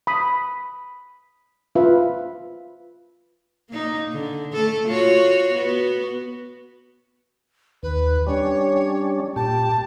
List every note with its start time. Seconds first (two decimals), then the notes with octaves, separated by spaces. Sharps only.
0.07 B5 D#6
1.75 F4 B4 E5
3.70 A#3 D#4
4.12 D3
4.53 A3 A4
4.88 F4 F#4 C#5
5.48 B3 F#4
7.83 D#2 B4
8.27 G3 C#4 D4 C#5
9.36 A#2 G4 A5